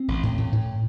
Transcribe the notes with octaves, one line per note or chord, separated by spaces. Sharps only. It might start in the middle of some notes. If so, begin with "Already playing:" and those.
Already playing: C4
A1
A2
A2
A2